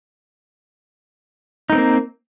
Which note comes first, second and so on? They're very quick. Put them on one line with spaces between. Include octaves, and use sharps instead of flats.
D#4 A3 C4 A#3